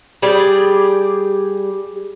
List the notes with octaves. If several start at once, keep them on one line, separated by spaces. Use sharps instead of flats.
G3 G4 G#4 D5